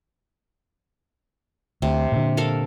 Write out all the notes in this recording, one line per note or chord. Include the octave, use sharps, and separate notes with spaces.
D2 C3
A#2 D3
A4 A#4 F5